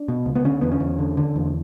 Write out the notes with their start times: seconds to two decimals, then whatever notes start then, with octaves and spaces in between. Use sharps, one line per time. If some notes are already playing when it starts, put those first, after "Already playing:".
Already playing: D4
0.08 B2
0.26 C#2
0.35 B3
0.45 D3 C#4
0.61 E2 B3
0.72 C#4
0.80 E2
0.99 D3
1.17 D3
1.36 E2